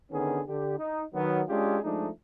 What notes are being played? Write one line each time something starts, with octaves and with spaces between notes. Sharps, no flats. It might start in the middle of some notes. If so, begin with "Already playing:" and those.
D3 D#3 B3 C#4 D#4 G#4
D3 G4
D#4
D#3 F#3 B3
G#3 C#4 D4 F4 G4 G#4
F3 G#3 A3 D4 D#4